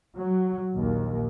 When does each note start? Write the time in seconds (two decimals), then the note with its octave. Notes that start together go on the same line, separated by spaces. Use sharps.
0.18 F#3
0.73 A#1 D#2